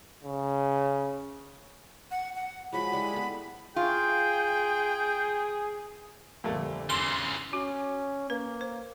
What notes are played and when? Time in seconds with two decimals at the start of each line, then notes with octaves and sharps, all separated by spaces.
0.24 C#3
2.11 F#5
2.36 F#5
2.73 F3 F#3 G#3 B5
2.92 G3 G#3 E4
3.14 B3 A4
3.76 F4 G#4 G5
6.44 F2 A#2 D3 G3 A3
6.90 E2 C#3 E3 C6
7.53 C#4 F#4
8.30 A#3 B4
8.61 C5